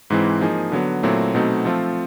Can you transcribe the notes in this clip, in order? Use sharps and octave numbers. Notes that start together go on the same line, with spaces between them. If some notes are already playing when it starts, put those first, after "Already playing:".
G#2 E3 G#3 C4 E4
F3 A#3 D#4 G#4
D3 F#3 B3
A#2 F#3 A3 C4 E4
B2 F#3 A3 C4 D#4
F3 A3 C4 F4 A4